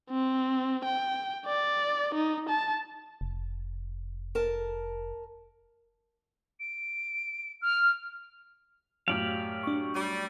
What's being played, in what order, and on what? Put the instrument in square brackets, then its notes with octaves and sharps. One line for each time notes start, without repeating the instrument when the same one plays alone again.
[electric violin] C4
G5
D5
D#4
A5
[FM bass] F1
[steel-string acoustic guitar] A#4 A5
[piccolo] D7
F6
[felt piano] F#2 A2 [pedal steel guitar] G4 D5 F5
[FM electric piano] D4 C#6
[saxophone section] G3